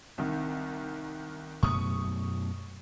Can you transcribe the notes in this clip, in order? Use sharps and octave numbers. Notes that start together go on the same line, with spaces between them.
C2 D#3
F#2 B2 A3 C#6 D#6